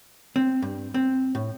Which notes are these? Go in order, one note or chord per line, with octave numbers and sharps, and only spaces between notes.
C4
G2
C4
A2